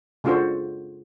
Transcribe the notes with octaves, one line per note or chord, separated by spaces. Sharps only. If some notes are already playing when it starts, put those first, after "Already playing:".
C#3 D4 F4 F#4 A4 C5